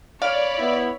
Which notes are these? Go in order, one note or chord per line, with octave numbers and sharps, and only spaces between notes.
C#5 D5 F5 B5
B3 E4